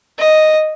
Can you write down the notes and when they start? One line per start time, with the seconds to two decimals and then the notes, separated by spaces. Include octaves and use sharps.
0.19 D#5